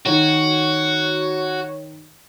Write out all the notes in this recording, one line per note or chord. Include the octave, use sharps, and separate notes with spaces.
D#3 F#4 C#5